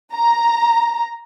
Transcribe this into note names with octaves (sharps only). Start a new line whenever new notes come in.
A#5